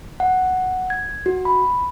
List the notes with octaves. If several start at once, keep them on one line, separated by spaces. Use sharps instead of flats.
F#5
G#6
F#4
B5